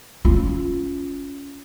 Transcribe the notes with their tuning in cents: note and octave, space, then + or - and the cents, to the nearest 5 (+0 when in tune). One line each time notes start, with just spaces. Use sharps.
C#4 +15 F4 +0